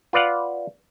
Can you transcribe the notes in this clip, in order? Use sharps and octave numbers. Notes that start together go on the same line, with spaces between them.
F4 B4 D5 F5 F#5